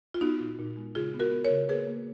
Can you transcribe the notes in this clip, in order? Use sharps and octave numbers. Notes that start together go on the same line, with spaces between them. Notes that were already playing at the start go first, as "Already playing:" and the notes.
F4
B3 D#4 F#4
A#2
A#2
G#3
C#3 F4 G#4
B3
F#4 A#4
B3
A#4 C#5
C#3
A#3 G#4 B4
A#3